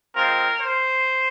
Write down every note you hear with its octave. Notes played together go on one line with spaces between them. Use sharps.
G#3 C4 F4 A#4
C5